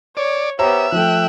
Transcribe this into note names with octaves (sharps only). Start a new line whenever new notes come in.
C#5 D5
B3 G4 C5 C#5 E5 A#5
F3 A3 G5 F#6